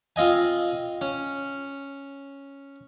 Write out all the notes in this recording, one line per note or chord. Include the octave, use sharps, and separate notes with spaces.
C4 F4 D#5 G#5
C#4